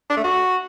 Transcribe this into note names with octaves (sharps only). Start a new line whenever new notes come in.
D4
A3
F#4